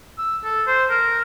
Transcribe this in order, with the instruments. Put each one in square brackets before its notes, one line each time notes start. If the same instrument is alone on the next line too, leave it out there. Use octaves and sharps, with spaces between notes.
[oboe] E6
A4
C5
A#4